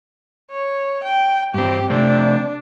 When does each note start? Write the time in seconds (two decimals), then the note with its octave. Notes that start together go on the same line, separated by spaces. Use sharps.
0.51 C#5
1.03 G5
1.54 G2 C4 G4
1.90 C3 A3 C4 D4